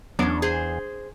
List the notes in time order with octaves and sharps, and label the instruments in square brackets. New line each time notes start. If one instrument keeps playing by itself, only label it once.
[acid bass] E2 [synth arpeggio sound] F#3 B3 D7 [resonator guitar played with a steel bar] C#4 D4
[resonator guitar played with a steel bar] G#4 C5